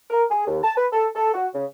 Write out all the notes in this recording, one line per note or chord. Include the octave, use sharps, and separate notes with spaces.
A#4
G#4
D#2
A5
B4
A4
A4
F#4
C#3